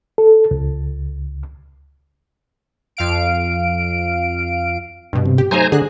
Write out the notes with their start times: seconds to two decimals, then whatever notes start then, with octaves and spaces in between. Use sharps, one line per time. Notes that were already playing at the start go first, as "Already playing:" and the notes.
0.18 A4
0.51 C#2
2.97 F2 F5 D7
5.13 G2 B2
5.26 C3
5.38 G4
5.51 F#3 A3 D#4 C5 G#5 A#5
5.72 D3 G#4 F#6